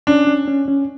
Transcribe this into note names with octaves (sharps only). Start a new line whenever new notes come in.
C#4 D4
C#4
C#4
C#4